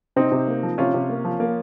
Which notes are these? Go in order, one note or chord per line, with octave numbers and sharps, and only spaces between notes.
C3 C4 D#4
C3
A#3
F3
C3 C#4 F4
C3
A#3
F3
A#3